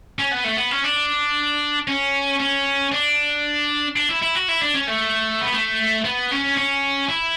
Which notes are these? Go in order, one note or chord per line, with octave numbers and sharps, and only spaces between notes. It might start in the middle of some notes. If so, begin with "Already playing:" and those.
C#4
B3
A3
B3
C#4
D4
C#4
C#4
D4
D4
E4
E4
F#4
E4
D4
C#4
A3
B3
A3
B3
C#4
C#4
E4